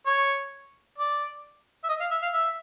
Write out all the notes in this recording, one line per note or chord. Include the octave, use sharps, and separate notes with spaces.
C#5
D5
E5
D#5
F5
E5
F5
E5